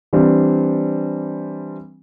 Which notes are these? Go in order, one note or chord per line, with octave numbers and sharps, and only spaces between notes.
E3 G3 C4 D4